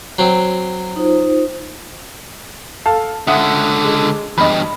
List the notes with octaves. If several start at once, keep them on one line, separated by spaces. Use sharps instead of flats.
F#3 C4
D#4 F4 C5
A4 F5 A5
C#2 D3 E5 F#5 D#6
G#3
E2 G2 D#5 B5